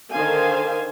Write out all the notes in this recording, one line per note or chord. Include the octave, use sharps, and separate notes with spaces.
D3 D#3 C5 F5 G#5